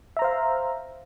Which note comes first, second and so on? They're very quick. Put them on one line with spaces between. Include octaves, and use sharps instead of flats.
E5 A#5 C5 F5